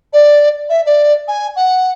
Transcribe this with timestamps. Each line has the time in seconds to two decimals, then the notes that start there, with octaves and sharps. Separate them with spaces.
0.13 D5
0.69 E5
0.85 D5
1.28 G#5
1.56 F#5